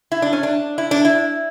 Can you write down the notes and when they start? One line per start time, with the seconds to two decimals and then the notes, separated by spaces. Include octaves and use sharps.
0.12 E4
0.22 D4
0.33 C#4
0.43 D4
0.78 E4
0.91 D4
1.05 E4